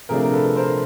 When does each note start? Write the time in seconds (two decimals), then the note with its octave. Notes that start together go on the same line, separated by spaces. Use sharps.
0.09 C3 F3 A3 D4 G#4 A#4
0.23 A#4
0.32 A4 B4
0.56 A#4 C5